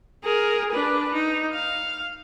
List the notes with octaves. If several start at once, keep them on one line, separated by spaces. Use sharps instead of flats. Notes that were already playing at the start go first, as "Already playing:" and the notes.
G#4 A#4
D4 B4
D#4
F5